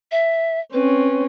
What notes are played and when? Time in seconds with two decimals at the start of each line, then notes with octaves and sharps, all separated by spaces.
0.12 E5
0.73 C4 C#4 B4